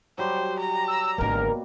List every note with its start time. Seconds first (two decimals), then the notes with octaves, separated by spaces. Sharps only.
0.18 F#3 G3 G4 C5
0.59 A#5
0.88 E6
1.18 G#1 B2 D3 A#3 A#4